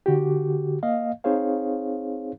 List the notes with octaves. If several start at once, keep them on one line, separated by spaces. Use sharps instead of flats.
D3 F#4 G4
A#3 D#5 F5
C4 D#4 G#4 C5 C#5 F5